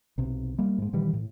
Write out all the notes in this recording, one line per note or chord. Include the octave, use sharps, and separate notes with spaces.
B1 C3
G3 A#3
G#2 G#3
A#2 D#3 E3 G3
A2